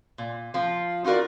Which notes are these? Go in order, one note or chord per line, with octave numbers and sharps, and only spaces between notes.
A#2
F3 F4
D#4 F4 F#4 A#4 D5